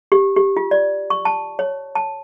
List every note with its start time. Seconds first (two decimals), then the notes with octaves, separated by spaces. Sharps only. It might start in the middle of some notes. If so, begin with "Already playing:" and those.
0.12 G4
0.36 G4
0.57 F4
0.71 D5
1.10 C#6
1.25 A5
1.59 C#5
1.95 A5